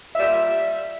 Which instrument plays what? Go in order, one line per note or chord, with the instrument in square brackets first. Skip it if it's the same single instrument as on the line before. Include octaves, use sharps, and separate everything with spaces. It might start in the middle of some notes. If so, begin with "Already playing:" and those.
[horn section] A#2 G3 E5